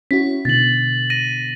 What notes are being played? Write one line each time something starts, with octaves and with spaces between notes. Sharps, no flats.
C#4 E4 F#4 B6
B2 D3 A6 F#7
A#6 D#7